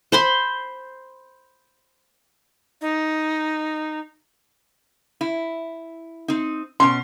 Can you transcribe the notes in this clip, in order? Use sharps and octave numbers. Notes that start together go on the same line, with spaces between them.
C5 B5 C6
D#4
E4
C4 D#4
B2 C#4 C6